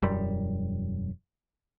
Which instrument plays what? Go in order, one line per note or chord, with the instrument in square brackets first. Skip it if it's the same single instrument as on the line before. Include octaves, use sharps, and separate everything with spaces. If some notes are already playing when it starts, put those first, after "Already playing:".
[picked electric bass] E1 F#2 G3